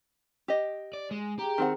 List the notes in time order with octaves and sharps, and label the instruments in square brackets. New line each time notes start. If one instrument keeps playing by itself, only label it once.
[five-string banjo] G4 D#5
[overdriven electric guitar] D5
G#3
[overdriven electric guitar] G4 [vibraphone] G#4 G5 A#5
[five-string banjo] D#3 C4 F#5